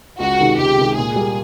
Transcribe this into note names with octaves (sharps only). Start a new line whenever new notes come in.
C#2 F#4
C3 D#3 G#3
C#2 G4
C3 D#3 G#3
A#2 G#4
G3 A#3